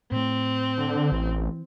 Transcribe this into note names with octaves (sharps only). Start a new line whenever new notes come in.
A2 A3 C4
D3
A1 E3